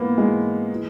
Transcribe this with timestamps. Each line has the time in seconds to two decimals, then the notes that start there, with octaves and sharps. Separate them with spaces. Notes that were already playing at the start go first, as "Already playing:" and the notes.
Already playing: G#2 E3 A#3 B3
0.18 G#2 E3 G#3
0.74 E3